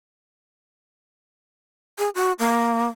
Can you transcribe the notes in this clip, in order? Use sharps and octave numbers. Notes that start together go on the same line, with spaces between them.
G#4
F#4
A#3